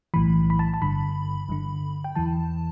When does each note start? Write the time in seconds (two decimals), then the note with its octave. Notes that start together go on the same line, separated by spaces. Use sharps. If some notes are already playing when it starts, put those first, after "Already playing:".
0.14 B1 A2 E3 B5
0.50 B5
0.59 A5
0.74 A5
0.82 G1 G2 D3 B5
1.48 G1 G2 D3
2.04 G5
2.15 E2 E3 A5